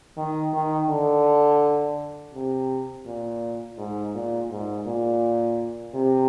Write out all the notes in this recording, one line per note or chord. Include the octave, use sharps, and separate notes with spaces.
D#3
D#3
D3
C3
A#2
G#2
A#2
G#2
A#2
C3